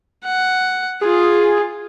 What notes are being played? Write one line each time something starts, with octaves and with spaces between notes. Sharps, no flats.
F#5
F4 G#4